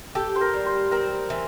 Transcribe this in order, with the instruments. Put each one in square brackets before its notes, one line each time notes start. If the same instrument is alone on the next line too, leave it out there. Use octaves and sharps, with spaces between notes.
[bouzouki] G4 [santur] A4
[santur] C5
A#4
[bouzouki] G3
[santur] C5
[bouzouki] C4 [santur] A#4
[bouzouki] E3